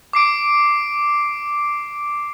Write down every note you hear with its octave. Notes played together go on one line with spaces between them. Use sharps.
D6 C7 D7